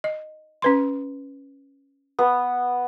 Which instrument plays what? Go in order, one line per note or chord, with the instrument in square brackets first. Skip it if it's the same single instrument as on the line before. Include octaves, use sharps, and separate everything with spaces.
[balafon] D#5
C#4 B4 C6
[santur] B3